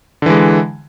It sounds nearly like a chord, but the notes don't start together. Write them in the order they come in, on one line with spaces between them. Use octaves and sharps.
D3 E3 G#3